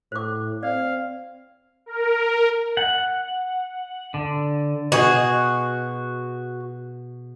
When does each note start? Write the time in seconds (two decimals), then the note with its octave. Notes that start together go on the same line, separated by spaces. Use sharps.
0.12 A2 C5 D6
0.63 C4 D5 F5
1.86 A#4
2.77 F#5
4.14 D3
4.92 B2 F#4 G#4